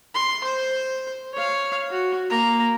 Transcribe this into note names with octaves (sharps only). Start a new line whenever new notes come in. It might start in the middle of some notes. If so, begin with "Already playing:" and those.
C6
C5
C#5 F5
F#4
A#3 A#5